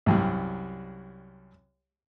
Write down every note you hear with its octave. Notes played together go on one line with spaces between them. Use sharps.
C2 F#2 G3